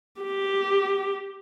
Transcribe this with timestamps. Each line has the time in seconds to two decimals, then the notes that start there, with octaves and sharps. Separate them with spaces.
0.21 G4